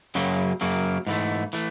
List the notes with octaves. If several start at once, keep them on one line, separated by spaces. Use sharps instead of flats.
F#2 C#3 F#3 A#3
F#2 C#3 F#3 A#3
G#2 E3 A3
E3 A3